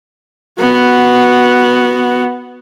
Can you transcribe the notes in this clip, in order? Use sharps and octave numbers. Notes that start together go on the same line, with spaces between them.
B3 F#4